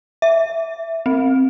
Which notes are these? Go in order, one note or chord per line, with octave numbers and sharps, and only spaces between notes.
E5
C4